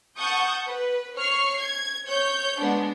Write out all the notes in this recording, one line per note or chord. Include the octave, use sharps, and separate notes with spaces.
F#5 A5 C#6 D#6 G6
B4
C#5 C#6 F6 C7
G#6
C#5 G6
G#3 B3 D4